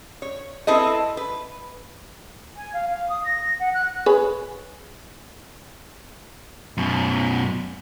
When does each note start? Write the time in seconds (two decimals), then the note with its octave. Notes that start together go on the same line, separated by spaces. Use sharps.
0.22 C#5
0.67 C4 E4 A4 B4 D#5
1.17 B4
2.56 G#5
2.73 F5
2.89 F5
3.09 D#6
3.25 A#6
3.59 F#5
3.74 F#6
4.06 G#4 B4 C#5
6.77 F#2 B2